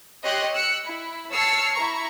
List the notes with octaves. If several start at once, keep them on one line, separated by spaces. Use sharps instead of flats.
G4 C#5 D#5 C6 F#6
E6 F#6 C#7
E4
C#5 A5 E6 F6 C7 C#7
E4 A#5 C#6